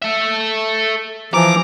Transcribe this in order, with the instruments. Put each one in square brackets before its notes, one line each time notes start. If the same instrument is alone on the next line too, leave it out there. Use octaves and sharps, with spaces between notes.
[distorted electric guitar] A4 E5
[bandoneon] E3 F3 D6 [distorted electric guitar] A#5